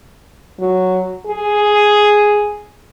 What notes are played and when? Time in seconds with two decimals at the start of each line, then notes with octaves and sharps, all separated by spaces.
0.60 F#3
1.27 G#4